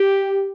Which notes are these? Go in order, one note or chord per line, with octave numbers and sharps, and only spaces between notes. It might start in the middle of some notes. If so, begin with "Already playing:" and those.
Already playing: G4